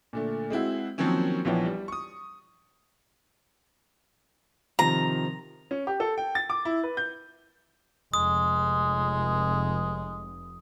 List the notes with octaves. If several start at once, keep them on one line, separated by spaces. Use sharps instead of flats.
A#2 D3 A3
G#3 C4 E4 F#4
D#3 F3 F#3 A#3 C4 C#4
A#1 E3 F3 B3 C#5 G5
G3
C#6 D#6
C3 D#3 F3 A#5
C#4
G4
A4
G5
A6
D6
E4
B4
G6
F1 G#3 D#6